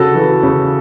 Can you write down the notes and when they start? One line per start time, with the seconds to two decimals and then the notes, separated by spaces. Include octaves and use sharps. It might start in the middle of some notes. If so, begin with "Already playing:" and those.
Already playing: C#3 F#4 A4
0.15 E3
0.43 C#3